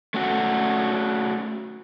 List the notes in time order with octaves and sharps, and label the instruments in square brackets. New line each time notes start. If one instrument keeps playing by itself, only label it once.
[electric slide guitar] A3 C#4 F#4